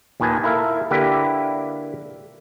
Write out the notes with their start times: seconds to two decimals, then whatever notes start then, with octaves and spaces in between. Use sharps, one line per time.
0.20 D#2 A#2 D#3 B4 G#5 A5
0.44 E4 A4 A#4 E5 F5
0.91 D3 A#3 E4 G4 B4 D5